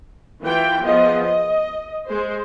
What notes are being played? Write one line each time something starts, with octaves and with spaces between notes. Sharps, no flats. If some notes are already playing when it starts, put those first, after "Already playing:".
E3 E4 F4 G5
F3 B3 G#4 D#5
D#5
G#3 C5